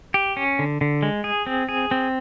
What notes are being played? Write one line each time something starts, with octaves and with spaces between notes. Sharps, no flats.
G4
C#4
D3
D3
G#3
G#4
C4
G#4
C4